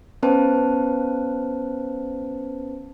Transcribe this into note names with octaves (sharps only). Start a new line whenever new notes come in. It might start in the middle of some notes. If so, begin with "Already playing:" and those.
B3 C#4 B4 C5 A5